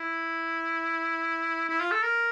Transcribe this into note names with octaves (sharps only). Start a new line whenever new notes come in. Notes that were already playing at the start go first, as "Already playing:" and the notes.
Already playing: E4
E4
F4
A4
A#4